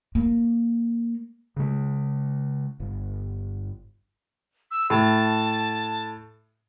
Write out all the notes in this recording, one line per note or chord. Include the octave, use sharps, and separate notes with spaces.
A#3
C#3 G#3
G1
E6
A2 A5